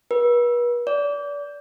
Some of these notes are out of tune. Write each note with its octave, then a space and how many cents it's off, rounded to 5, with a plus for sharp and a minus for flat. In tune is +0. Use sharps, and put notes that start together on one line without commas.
B4 -40
D5 -30